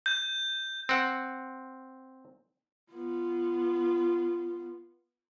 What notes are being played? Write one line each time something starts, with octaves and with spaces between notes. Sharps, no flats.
G6
C4 F#5
B3 F4